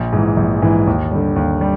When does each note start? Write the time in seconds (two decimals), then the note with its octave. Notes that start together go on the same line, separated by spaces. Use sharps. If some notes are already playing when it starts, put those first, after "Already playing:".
Already playing: A#1
0.13 G#2 E3
0.37 A#1
0.62 G#2 E3
0.87 D#2
1.11 D3 G3
1.36 D#2
1.61 G3